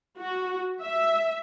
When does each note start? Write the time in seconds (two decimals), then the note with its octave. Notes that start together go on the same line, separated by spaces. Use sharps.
0.18 F#4
0.81 E5